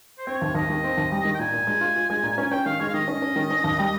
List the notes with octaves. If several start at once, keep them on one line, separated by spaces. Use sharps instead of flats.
C5
C4 C#5
D#2
D#2 D#5
D#3
C4
D#2
G3
D#3
G5
A#2 G#5
A#2
G#3
F4
F4
G#3
A#2
C#4
C#4 G5
D#3 F5
G#3 C#5
F5
D#3 D#5
C#4
C#4
D#3
C#4
D#2
G3